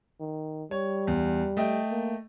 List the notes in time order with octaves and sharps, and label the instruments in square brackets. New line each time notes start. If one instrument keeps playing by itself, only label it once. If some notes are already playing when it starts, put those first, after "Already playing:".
[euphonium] D#3
[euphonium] G3 [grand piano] C#5
[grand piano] E2
A3 D#5 G5
[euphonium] A#3